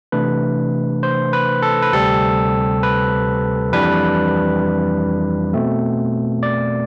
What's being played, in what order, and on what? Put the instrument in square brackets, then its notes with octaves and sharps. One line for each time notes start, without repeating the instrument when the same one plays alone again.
[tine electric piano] C3 E3 A3 D4 B4
C5
B4
A4
B4
D2 C3 G3 C4 A4
B4
F2 E3 G3 D4 B4
B2 A3 C4
D5